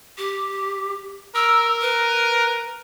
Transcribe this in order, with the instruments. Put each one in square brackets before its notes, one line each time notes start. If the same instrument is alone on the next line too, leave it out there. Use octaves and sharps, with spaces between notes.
[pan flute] G4
[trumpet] A#4 [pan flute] E6
[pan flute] B4